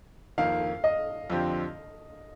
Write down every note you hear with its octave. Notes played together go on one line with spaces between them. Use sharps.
F2 D#3 A#3 F5
D#5
F2 D3 F3 C4 G4